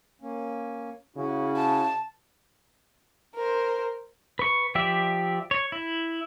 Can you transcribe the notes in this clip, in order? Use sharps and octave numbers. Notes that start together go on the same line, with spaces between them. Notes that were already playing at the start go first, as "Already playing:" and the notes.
A#3 C#4
C#3 C#4 E4 F#4
A5
A#4 C5
B4 C#6
F3 G4 D5 E5
C#5
E4